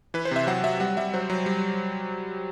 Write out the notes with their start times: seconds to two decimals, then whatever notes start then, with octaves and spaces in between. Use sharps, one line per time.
0.14 E3 B4
0.25 C5
0.31 C3 E5
0.47 F#3 F#5
0.64 F#3 E5
0.80 G3 F#5
0.97 G3 E5
1.13 F#3 C5
1.30 F#3
1.46 G3